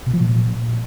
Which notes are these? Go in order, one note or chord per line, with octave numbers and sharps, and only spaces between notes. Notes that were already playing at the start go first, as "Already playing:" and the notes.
B2
F3
A#2